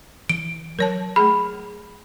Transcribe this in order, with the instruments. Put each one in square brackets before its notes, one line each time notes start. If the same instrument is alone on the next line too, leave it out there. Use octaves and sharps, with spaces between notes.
[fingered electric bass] E3 [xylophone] D7
[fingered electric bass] F#3 [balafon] A#4 C#5 A5
[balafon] A3 G#4 [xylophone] B5